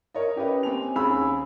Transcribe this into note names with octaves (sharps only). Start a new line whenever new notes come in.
A#4 C#5 D#5
C#4 G4 A#4 B4 D#5
C4 G#5 F7
D#2 C#4 G#4 B5 E6